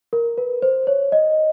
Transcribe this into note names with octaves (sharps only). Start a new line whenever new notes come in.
A#4
B4
C5
C#5
D#5